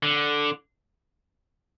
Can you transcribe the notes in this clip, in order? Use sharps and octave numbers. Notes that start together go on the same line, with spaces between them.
D3